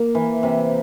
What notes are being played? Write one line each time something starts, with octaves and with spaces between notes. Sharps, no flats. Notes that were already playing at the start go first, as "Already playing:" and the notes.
Already playing: A#3
E3
C3